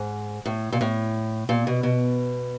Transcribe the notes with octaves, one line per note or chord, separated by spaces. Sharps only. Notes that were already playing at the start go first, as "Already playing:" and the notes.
Already playing: G#2
A2
A#2
A2
A#2
B2
B2